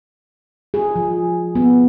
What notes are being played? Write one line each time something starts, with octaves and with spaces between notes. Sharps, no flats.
G#4
F3
B3